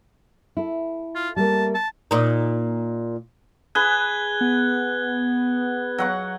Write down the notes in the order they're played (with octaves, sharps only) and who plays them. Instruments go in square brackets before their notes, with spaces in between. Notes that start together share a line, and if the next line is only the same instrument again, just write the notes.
[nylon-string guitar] E4 A4
[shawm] F4
[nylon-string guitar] G3 A3 A#3 [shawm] A5
[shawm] A5
[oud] A#2 D#4
[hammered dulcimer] G#4 B4 [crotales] F#6 G#6 G7
[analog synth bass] B3
[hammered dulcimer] F#3 F#5 C#6